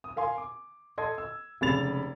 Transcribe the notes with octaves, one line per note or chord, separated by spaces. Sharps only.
D#6
A#4 F5 G#5 C6
D6
A4 D#5 C6 G#6
E6
F1 C#3 G#3 B5 A6 F7